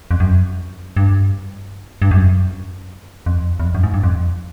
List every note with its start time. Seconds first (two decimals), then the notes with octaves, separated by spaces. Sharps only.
0.11 F2
0.20 F#2
0.97 G2
2.02 G2
2.11 F#2
3.26 F2
3.60 E2
3.65 F2
3.75 F#2
3.83 G#2
3.94 G2
4.03 F2